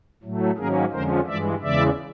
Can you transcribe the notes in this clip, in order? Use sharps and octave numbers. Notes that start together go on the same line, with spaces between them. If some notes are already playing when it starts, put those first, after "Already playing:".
A2 F#3 A3
G#2 D#3 F#3 A#3 C#4 G#4 A#4
F2 D3 F3 G#3 C#4 A#4 C5
G2 E3 G#3 D5 E5
E2 C#3 E3 G#3 D5 E5